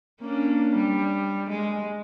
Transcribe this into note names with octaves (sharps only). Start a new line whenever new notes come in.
A#3 C#4 D4
G3
G#3